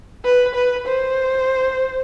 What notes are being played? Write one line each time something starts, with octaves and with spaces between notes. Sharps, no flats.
B4
B4
C5